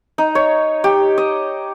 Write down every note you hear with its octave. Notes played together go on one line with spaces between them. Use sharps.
D#4
C#5
G4
D#5